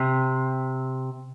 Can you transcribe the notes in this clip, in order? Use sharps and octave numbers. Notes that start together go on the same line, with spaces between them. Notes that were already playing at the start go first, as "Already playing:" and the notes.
Already playing: C3